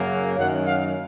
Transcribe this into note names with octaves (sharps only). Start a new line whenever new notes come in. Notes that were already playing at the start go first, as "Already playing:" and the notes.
Already playing: F#2 C#3 F#3 A#3
F#2 D#3 F#3 A#3 F#5
F5